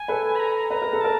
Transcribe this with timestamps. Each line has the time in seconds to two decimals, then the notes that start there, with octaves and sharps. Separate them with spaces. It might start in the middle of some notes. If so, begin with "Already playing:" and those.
Already playing: G#5
0.08 A4 B4
0.35 B5
0.39 A#5
0.70 B4 A#5
0.82 A#4
0.93 A4
1.01 A#4 A5